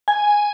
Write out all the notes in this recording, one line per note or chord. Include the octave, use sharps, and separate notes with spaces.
G#5